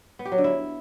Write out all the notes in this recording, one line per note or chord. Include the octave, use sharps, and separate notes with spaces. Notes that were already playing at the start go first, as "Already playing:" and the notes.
B3
G4
F#3
D3
E4